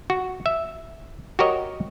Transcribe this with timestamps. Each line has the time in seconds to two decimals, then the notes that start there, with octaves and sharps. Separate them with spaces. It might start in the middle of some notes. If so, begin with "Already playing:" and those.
0.10 F#4
0.46 E5
1.39 F#4 G4 A#4 C#5 D#5